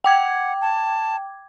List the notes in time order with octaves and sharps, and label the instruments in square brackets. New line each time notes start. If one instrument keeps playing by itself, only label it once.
[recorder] F#5 [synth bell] G5 D6 G#6
[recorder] A5